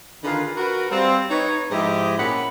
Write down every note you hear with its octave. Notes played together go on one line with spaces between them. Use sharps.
D3 D#3 F4 G#4 A#4 B4
F#4 A#4 B4
G3 C4 F4
D#4 B4 C#5
G#2 F3 E4 G4 D#5
A#2 C#4 F#5 B5